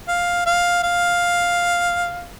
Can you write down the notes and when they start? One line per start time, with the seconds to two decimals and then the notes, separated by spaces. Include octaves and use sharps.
0.08 F5
0.46 F5
0.83 F5